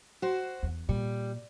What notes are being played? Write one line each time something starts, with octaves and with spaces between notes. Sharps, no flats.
F#4 C5
E2
A#2 G3